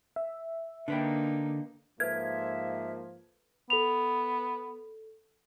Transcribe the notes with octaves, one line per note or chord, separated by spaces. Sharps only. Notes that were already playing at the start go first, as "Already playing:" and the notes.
E5
D3 A#3 D4 D#4 B4 G5
G#2 F3 A#3 A4 B4 E5 G#6
B3 A4 F7